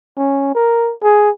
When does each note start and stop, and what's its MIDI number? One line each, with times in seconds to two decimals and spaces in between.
0.17 0.51 61
0.55 0.93 70
1.03 1.30 68